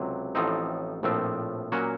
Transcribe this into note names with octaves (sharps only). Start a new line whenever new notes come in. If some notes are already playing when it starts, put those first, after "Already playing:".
Already playing: C#2 C3 F#3
A1 A2 F3 C4 D#4
A#1 A2 F3 A3 C4
A#2 F#3 A#3 C#4 F#4